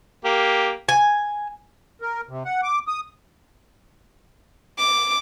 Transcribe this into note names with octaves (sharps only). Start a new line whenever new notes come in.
A#3 G4
G#5
A#4
C3
F#5
D6
D#6
D6